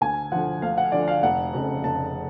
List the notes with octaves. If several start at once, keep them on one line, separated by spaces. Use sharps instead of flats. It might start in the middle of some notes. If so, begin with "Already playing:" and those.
D2 G#5
D3 F3 F#5
D2 F5
F#5
D3 F3 D5
F5
F1 F#5
F2 C#3
F1 A5